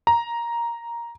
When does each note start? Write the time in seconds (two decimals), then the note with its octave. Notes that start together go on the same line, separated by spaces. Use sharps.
0.07 A#5